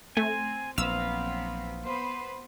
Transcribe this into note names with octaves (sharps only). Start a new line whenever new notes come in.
A3 C4 G#5
A#1 F#3 B3 C4 F5 E6
B3 B4 C5